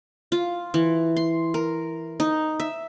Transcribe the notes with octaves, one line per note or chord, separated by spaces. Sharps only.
F4
E3
C6
A#4
D#4
E5